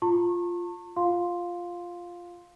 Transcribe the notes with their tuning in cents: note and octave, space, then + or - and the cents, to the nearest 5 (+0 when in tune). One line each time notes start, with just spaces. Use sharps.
F4 +0 A5 +40 C#6 -35
F4 +0 F5 +10 C6 +0